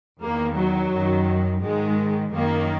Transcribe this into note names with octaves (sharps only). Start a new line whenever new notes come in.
E2 D#3 A#3
F#3
F#2 D#3
G#2 D#3 G#3
F#2 D#3 A#3